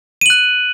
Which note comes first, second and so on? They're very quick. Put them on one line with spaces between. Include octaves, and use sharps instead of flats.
D#7 F#7 F#6